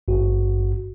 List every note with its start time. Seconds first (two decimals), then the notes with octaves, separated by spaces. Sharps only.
0.08 G#1 G2 F#4